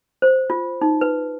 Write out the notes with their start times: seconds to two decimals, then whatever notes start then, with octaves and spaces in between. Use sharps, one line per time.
0.22 C5
0.50 F4
0.81 D#4
1.01 B4